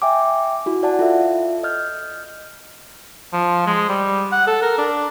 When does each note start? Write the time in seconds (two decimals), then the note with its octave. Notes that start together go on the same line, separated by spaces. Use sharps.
0.02 E5 G5 G#5 D6
0.66 E4 F#4
0.83 D5 F#5 A5
0.99 F4 A4 E5
1.63 D#5 F6 G6
3.34 F3
3.66 G#3
3.89 G3
4.32 F#5
4.47 A4
4.62 A#4
4.78 D4